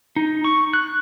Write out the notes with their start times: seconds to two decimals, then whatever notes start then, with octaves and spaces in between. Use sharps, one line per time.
0.16 D#4
0.44 C#6
0.73 F#6